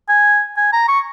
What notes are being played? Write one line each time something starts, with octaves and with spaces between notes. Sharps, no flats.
G#5
G#5
A#5
C#6